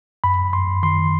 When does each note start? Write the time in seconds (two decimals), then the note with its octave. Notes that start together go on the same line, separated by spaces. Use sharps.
0.24 F#2 B5
0.53 F#2 C6
0.83 D#3 C6